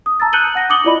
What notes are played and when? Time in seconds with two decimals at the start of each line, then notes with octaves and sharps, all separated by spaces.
0.06 D#6
0.20 A5 A#5 E6 A6
0.33 F#6 G6 C#7 D#7 F#7 G7
0.55 F#5 A#6 D#7
0.70 D6 D#6 C#7 F#7 G7
0.84 E4 F4 D5 D#5 B5